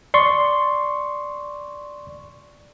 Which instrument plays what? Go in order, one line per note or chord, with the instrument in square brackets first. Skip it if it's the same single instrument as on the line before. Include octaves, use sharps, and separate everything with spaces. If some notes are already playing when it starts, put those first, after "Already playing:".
[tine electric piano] D5 C6 C#6